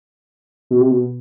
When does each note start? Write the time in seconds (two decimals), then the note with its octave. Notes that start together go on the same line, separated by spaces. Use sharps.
0.71 B2
0.81 C3
0.91 B2